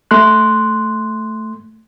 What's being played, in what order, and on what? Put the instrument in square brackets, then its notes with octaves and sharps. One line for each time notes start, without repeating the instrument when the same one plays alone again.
[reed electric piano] A3 C6 F#6